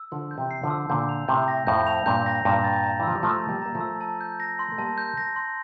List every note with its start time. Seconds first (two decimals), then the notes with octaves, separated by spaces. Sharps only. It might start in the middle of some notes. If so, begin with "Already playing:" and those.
Already playing: E6
0.12 D3 F3 C6
0.31 G6
0.38 C3 E3
0.51 C7
0.63 D3 F3
0.70 E6
0.90 A#2 D3 G6
1.09 F7
1.28 A2 C3 G6
1.48 A#6
1.67 F2 A2 G6
1.87 F7
2.06 G2 A#2 G6
2.26 A#6
2.45 G2 A#2 A#5
2.64 A6
2.84 A#5
3.00 E3
3.03 F3 E6
3.15 G3
3.23 F3 A3 A#5
3.42 A6
3.49 G3 A#3
3.62 A#3 A#5
3.75 F3 A3
3.81 E6
4.01 A5
4.21 G6
4.40 A#6
4.59 C6
4.72 A3
4.78 G3 A#3 A5
4.98 G6
5.18 A#6
5.36 C6